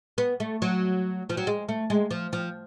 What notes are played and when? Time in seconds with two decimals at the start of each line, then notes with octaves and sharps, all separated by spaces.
0.18 B3
0.40 A3
0.62 F#3
1.30 F3
1.37 F#3
1.47 G#3
1.69 A3
1.90 G#3
2.11 F3
2.33 F3